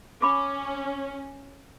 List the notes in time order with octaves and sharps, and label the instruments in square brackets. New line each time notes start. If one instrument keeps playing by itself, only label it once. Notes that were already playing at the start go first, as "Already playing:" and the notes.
[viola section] C#4 [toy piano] B5 D6